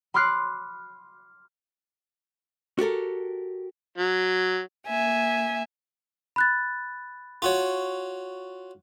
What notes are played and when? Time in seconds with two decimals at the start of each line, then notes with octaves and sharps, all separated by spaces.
0.14 B5 C6 D6 F6 F#6 C7
2.79 F#4 G4 A4 A#4
3.98 F#3
4.88 A#3 E5 G#5
6.36 B5 F#6 A6
7.42 F4 F#4 C#5